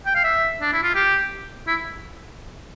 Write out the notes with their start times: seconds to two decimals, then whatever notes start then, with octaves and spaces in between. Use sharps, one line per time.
0.06 G5
0.15 F5
0.24 E5
0.61 D4
0.73 E4
0.83 F4
0.95 G4
1.67 E4